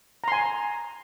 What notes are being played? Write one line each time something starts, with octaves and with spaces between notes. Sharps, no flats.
G#5 A#5 C6